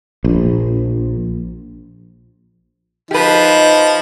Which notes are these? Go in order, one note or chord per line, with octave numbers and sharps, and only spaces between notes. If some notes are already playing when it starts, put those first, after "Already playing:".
A#1
F3 D#4 G4 B4